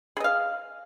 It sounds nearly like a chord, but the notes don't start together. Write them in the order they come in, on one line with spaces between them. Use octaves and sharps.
G#4 D#5 F5